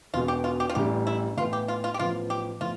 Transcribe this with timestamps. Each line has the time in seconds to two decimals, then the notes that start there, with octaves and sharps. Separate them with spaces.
0.13 E1 E2 B2 F4
0.28 G4
0.44 F4
0.60 G4
0.69 F4
0.75 A1 A2 E3 G3 D4 G4
1.07 E4
1.37 A2 E3 B3 F4
1.53 G4
1.68 F4
1.84 F4
1.94 G4
1.99 A1 A2 F3 B3 F4
2.30 G4
2.61 A2 F3 B3 F4